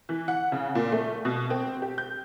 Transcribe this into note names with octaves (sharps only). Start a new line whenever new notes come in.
E3
F#5
C#3
A#2
A3
B2
C4
G4
G6